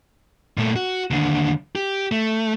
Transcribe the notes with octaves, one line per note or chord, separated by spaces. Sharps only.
A#2 A3
F#4
D#2 D3
G4
A3